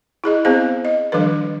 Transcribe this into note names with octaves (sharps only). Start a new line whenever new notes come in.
E4 G#4 D#5
B3 C4 E4 G#4 C5 F5
D#5
D#3 F3 G3 D4 A4 B4